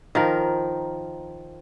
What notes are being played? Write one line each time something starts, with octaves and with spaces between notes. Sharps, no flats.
D#3 F3 A#4